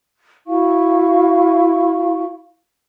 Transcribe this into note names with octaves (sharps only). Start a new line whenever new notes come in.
E4 F#4 F5 C#6